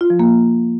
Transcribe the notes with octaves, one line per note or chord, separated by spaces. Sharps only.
F4
F3
A#3